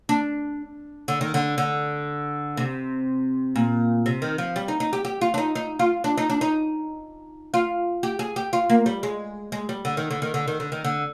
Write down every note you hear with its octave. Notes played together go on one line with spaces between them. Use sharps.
D4
D3
D#3
D3
D3
C3
A#2
C3
D#3
F3
G3
D#4
D#4
G4
G4
F4
D4
D#4
D#4
F4
D4
D#4
D4
D#4
F4
G4
G#4
G4
F4
A#3
G3
G#3
G#3
G3
D3
D#3
D3
D#3
D3
D#3
D3
D#3
D3